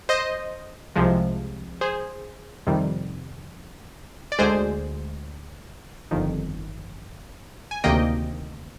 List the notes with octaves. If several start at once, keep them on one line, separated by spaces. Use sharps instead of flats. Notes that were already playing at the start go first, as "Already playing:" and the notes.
C5 D#5
C2 C3 F3 G#3
G#4 C5
F2 C3 D#3 G3
D5
D2 D3 G#3 G#4 C5
G1 F2 D#3
G#5
D2 C3 D#3 A#3 D#5 G5